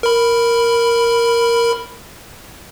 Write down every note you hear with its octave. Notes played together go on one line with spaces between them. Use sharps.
A#4 B5